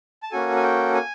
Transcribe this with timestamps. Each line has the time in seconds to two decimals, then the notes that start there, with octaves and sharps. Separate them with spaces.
0.23 A5
0.31 A#3 C#4 F#4 A4 G#5
0.57 G#5
0.63 G5
0.95 G#5